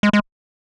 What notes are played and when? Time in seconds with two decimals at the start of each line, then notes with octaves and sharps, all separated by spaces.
0.03 G#3
0.13 G#3